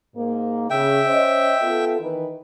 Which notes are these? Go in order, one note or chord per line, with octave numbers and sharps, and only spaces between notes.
G#2 A#3
C#3 E5 G5
C#4 C5 D#5
B3 F4 A4
D#3 E3 B4